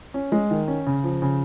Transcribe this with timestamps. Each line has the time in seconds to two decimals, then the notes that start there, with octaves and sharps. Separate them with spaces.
0.14 C#4
0.32 G#3
0.51 D#3
0.68 C#4
0.86 C#3
1.04 F3
1.22 C#3